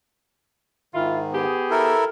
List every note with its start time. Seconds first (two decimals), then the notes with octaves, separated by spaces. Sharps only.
0.95 G#2 D#3 E4 F4
1.34 B3 G4 G#4
1.70 E4 A4 A#4